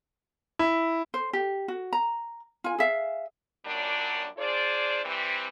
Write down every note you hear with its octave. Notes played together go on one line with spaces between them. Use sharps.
E4
C5
G4
F#4
A#5
F4 G#5
G#4 E5 F5
F#2 A#2 F#3 G3 D4
D4 F4 G#4 C5 D5
E3 G3 C4